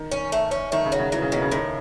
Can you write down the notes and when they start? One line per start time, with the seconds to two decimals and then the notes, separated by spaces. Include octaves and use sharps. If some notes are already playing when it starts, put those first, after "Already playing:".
Already playing: D#3
0.11 C#4
0.32 A3
0.51 C#4
0.72 D#3 A3
0.85 C#3
0.92 F#3
0.99 C#3
1.12 E3 F#3
1.22 C#3
1.32 B2 D#3
1.42 C#3
1.52 A2 D#3